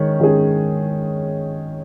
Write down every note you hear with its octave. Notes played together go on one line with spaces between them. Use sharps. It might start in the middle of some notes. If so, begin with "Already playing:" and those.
Already playing: D#3 G#3 C#4
D#3 G#3 C#4 G#4